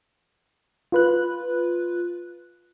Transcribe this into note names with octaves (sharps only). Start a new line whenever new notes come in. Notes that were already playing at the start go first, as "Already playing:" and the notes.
F4 B4 F#6